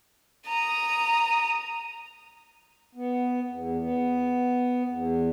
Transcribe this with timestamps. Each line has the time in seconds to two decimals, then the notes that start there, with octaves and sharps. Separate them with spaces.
0.46 A#5 D#6
2.95 B3
3.50 E2
3.79 B3
4.88 E2